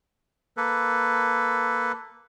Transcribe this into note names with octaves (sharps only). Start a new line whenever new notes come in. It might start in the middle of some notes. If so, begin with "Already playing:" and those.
A#3 A4 B4